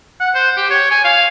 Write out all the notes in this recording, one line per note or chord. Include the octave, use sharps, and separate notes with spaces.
F#5
C5
G4
C#5
G#5
F5